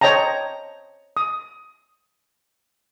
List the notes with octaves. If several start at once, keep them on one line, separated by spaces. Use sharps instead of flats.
C5 C#5 D#5 G5 A5 A#5
D#6